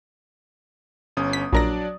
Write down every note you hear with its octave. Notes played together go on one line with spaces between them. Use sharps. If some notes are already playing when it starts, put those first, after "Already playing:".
G1 C#4 D#6
B6
A#1 F#3 D4 A#4 D5 A#6